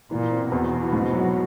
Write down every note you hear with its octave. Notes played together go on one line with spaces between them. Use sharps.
A#2 E3
C4
E2 B2
E3
G#2
F#3